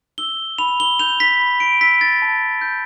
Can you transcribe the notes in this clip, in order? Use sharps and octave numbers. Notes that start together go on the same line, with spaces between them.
E6 G7
B5 F7
G7
G6 F7
B6
B5
D7
E6 B6
A6
A5
G6